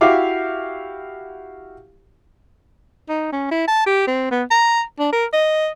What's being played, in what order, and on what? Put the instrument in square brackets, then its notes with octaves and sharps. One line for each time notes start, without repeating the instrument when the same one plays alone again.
[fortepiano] E4 F#4 G4 E5 F5 D6
[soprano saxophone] D#4
C#4
E4
A5
G4
C4
B3
A#5
D4
A#4
D#5